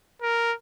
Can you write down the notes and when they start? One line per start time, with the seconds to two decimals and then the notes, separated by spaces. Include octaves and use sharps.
0.22 A#4